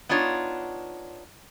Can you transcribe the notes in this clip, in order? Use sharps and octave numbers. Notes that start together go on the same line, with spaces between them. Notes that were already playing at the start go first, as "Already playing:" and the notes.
B3 D4 D#4 F4 C#5